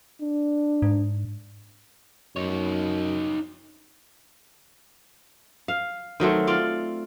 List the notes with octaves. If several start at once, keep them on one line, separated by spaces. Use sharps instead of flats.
D4
G#2
F#2 D#4 C#5
F5
D#3 F#3 A3 C4
F4 D5 F5